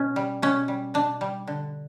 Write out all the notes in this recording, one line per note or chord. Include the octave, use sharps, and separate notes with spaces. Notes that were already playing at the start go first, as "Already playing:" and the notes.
Already playing: B2 C#4
G3
B2 C#4
G3
B2 D4
G3
D3